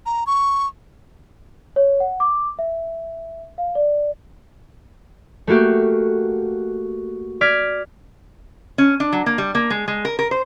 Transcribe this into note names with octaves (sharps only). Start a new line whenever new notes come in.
A#5
C#6
C#5
F#5
D6
E5
F5
D5
A3 A#3 F#4 G4
D5 D6 F6 G#6 B6
C#4
D4
F#3
A#3
G3
A#3
G#3
G#3
A#4
A#4
C5